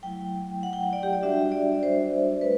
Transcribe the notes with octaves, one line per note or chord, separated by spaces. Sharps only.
F#3 A3 E4 G5
F#5
G5
F#5
D5
G4
D5
G3 D4 F#4 E5
D5
C5
A3 B4